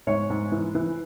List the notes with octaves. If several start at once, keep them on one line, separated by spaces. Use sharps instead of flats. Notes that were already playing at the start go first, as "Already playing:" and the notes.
G#2 C#5
G#2
E3
E3